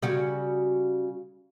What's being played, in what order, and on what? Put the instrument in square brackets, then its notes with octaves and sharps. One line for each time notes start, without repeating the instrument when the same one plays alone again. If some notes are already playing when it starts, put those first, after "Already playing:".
[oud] C#3 G3 F#4